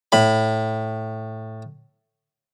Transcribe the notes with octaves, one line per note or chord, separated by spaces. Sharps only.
A2 B5